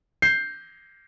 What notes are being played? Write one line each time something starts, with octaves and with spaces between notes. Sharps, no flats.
G6 C7